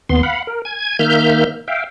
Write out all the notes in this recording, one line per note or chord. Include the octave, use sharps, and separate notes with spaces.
D#2 B3 C6
F5 F#5 B5
A#4
G#5 G#6
D#3 A#3 E5 F6 G6
E5 F5 G5